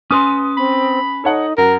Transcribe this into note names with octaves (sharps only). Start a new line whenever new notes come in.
C#4 B4 C6 D#6
C4 B5
D#4 A4 C#5 F#5
F#2 A#4 F#5